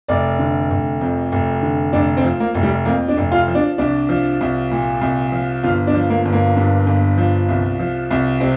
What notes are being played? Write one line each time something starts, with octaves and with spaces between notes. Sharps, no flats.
F1 D5
D3
F1
F2
F1
D3
F1 D4
C4
F3
A#3
F1
G3
F2 A#3
D4
F1
F4
F3
D4
C2 D4
F3
C2
A#2
C2
F3
G1 F4
D4
F3
A#3
G1
A#3
G2
G1
F3
C2
F3
C2
C3 C4